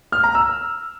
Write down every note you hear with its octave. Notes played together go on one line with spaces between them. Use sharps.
F6
A#5
E6